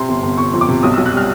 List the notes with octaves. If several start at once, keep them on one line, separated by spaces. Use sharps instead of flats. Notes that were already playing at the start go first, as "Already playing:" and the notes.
Already playing: C3 C6
G1
G1
G1 C#6
F2
D6
C3
B1 D#6
E6
B1
F#6
G3 F6